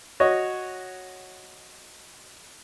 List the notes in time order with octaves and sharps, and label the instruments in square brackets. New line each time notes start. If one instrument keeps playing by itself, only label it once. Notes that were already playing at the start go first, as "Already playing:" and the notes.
[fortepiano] F#4 C#5 D#5